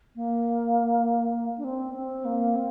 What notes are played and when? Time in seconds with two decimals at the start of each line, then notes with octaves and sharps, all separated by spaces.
0.16 A#3
1.58 D4
1.64 C4
1.94 C4
2.25 A#3
2.56 C4